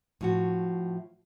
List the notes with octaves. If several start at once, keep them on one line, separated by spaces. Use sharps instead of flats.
A2 F3 F#4